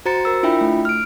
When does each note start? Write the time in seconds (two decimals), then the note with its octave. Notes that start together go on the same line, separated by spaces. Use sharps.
0.06 F#4 C5 A#5 A6 C#7
0.25 A#4 E6
0.43 D4 E4 F4 E5 G5 B5
0.61 A3
0.85 F6 D7